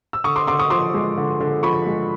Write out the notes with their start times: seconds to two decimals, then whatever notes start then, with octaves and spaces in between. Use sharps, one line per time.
0.13 E6
0.24 D3 C#6 D#6
0.36 C6 D6
0.47 D3 C6 D6
0.59 C#6 D#6
0.70 F3 C6 D6
0.94 G#3
1.18 D3
1.40 D3
1.63 F3 B5 C#6
1.87 G#3